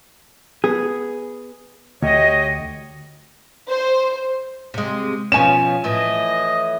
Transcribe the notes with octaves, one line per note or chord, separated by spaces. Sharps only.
B3 G#4
D2 G4 C#5 D#5
C5
C3 G#3
B2 F3 C#4 G#5 E7
A2 E3 D#5